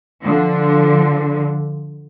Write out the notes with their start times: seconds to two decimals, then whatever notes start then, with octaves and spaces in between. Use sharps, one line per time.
0.23 D3 F3